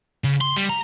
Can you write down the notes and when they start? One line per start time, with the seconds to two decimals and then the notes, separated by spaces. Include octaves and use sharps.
0.24 C#3
0.41 C6
0.57 G3
0.69 A#5